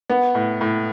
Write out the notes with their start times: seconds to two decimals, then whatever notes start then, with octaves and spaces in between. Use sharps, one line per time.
0.09 B3
0.35 A2
0.61 A2